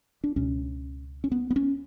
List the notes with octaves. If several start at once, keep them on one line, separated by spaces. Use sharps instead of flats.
D4
C#2 B2 C#4
C#4
B3
B3
C#4